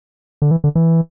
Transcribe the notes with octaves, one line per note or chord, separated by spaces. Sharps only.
D3
E3
D3
E3